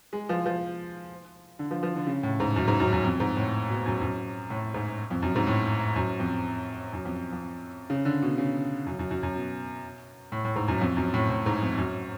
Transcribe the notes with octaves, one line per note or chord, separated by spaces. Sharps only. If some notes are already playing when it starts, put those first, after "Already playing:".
G#3
F3
F3
D3
F3
F3
D3
C#3
A2
G#2
F#2
G#2
F#2
F#2
F2
G#2
A2
B2
F#2
F#2
A2
G#2
F2
F#2
G#2
A2
F#2
F2
F#2
F2
F2
C#3
D3
B2
C#3
F#2
F#2
F#2
F#2
B2
A2
A2
G#2
F#2
F2
F#2
A2
A2
G#2
F2
F#2